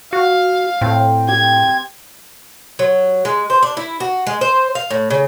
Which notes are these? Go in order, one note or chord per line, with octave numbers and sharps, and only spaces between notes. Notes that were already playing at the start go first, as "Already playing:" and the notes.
F#4 F5
A2 C4
G4 G#6
F#3
G#3
C5
D4
E4
F#4
G#3
C5
F5
A2
C#3